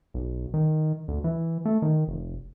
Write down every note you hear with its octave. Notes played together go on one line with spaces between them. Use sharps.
B1
D#3
D2
E3
A3
D#3
F1